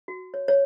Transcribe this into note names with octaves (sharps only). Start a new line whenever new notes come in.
F#4
C#5
C#5